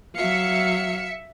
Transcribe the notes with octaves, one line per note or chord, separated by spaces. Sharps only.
F#3 E5 F5 C#7